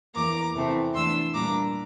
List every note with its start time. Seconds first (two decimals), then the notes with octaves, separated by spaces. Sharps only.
0.15 E2 E3 A#3 A#5 D6
0.54 E2 C3 E3 A3 C4
0.94 E2 E3 A3 D4 C6 E6
1.34 A#2 G3 A#3 D4 A#5 D6